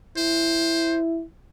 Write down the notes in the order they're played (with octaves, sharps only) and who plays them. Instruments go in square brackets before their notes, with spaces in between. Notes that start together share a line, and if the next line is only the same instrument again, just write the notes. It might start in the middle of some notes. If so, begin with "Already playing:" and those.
[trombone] E4 [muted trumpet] C5